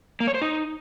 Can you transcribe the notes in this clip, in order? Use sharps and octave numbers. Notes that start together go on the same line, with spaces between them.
A#3
C#5
C5
D#4